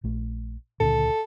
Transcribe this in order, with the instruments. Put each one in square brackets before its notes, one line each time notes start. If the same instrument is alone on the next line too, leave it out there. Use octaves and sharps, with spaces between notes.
[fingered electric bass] A#1 A3
[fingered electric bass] C#2 A#2 D3 [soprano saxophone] A4